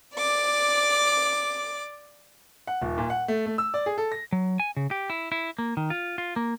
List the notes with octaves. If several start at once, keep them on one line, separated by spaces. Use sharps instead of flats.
D5 D6
F#5
D#1
A#2
F#5
A3
A3
E6
D5
G#4
A4
A#6
F#3
G#5
C#3
G4
E4
E4
A#3
D#3
F4
F4
A#3